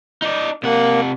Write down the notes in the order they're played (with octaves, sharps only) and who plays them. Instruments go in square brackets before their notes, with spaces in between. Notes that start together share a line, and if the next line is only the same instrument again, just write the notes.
[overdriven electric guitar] D#4 D5
[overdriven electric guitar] C3 F#5 [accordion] A#3